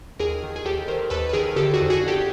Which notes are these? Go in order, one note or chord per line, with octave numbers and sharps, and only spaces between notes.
D#2 G#4 A#4
D#3
G#4
D#2 G4 A4
D#3 A#4 C5
D#2 A4 B4
B4
D#3 G#4 A#4
D3 G4 A4
F#4 G#4
F2
F#4 G#4
G1
G4 A4